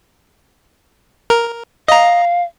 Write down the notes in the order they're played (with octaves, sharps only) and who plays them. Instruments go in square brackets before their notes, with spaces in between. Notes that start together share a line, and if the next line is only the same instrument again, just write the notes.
[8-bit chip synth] A#4
[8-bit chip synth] D#5 A#5 [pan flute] F5